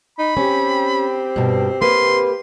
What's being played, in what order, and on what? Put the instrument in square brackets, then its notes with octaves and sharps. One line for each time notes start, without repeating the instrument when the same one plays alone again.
[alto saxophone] D#4 [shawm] B5
[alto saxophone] C4 [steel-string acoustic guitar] C#4 [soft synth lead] G4
[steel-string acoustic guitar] G2 B2
[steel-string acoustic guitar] A#3 B4 [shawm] C6